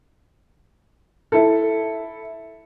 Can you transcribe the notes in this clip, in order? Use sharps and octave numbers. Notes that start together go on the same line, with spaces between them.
E4 A4